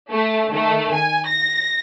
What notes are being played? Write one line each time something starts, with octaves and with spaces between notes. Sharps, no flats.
A3
D#3 A3
G#5
A#6